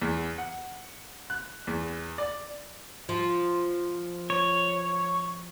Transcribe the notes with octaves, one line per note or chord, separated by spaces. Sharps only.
E2
F#5
F#6
E2
D5
F3
C#5